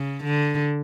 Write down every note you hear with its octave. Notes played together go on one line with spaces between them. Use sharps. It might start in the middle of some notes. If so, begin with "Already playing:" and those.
Already playing: C#3
D3